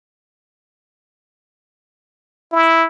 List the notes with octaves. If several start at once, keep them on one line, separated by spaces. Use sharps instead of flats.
E4